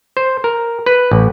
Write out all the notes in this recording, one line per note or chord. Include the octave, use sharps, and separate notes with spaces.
C5
A#4
B4
A1